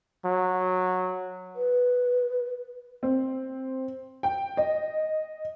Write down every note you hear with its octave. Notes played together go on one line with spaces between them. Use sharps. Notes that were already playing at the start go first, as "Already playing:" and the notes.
F#3
B4
C4
G5
D#5